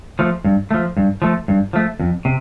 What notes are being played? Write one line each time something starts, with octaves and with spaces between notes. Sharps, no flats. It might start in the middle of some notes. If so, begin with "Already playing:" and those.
F3 A3
G2
F3 A3
G2
F3 A3
G2
F3 A3
F2
C3